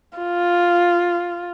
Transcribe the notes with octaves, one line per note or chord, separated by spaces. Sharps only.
F4